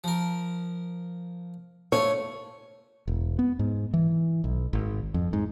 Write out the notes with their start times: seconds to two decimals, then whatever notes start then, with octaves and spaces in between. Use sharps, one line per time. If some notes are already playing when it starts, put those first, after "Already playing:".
0.04 F3 A#4
1.92 A3 C#4 F4 C#5
3.07 E1
3.39 B3
3.59 G#2
3.93 E3
4.44 B1
4.73 G#1
5.14 F2
5.33 G#2